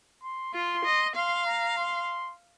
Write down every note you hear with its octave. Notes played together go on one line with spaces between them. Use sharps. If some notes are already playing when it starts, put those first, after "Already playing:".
C6
F4 C6
D#5
F5 C6
A#5
C6